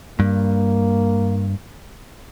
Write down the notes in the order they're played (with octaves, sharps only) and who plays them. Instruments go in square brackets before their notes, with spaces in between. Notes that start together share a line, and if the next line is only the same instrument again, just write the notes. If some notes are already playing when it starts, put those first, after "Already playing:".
[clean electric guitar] G2 [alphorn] A#3